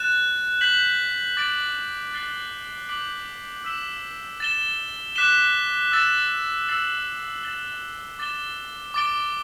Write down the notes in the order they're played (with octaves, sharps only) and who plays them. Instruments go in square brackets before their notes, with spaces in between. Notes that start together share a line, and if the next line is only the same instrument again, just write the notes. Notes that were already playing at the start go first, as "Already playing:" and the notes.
Already playing: [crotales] F#6 A6 E7
G6 B6 F#7
D6 A6 D7
F#6 A6 C7 G7
D6 G6 B6 D7 F#7
E6 B6 E7 G7
A6 E7 G7
D6 F#6 B6 E7 G7
E6 A6 E7 G7
E6 A6 C7 F#7
A6 E7 G7
D6 A6 E7 G7
D6 A6 D7 G7